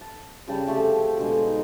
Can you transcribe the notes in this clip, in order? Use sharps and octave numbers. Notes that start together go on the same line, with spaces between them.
A5
C#3 G3 G5 A5
C3 F3 A3 G4
B2 D3 G#3
D#4